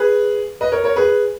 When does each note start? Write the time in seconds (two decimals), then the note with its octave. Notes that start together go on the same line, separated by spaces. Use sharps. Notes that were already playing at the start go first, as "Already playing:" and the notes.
Already playing: G#4 B4
0.61 B4 D#5
0.72 A#4 C#5
0.84 A#4 C#5
0.96 G#4 B4